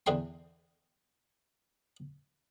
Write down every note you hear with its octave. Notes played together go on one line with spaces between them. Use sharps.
E2 D3 E3 G#4 G5 C6